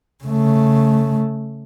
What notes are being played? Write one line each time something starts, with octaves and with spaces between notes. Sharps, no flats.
C#3 A3